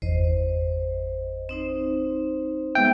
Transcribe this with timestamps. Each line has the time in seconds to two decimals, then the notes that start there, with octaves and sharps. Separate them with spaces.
0.02 G1 E2 C5 D#5
1.49 C4 D#4 C5
2.75 G#3 B3 E5 G5